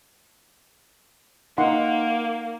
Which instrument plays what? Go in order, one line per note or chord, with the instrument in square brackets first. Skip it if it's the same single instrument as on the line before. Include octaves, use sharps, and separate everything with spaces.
[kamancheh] A#3 [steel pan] D#4 F#5 C6